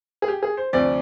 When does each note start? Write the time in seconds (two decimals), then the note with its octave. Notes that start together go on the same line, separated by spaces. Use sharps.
0.22 G#4
0.28 G4
0.43 G#4
0.57 C5
0.73 D2 C3 F3 D5